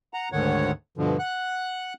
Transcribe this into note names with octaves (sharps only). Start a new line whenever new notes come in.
F#5 A#5
D2 G#2 D3 D#3 C#5 F#5
G2 B2 D3 F3
F#5 F#6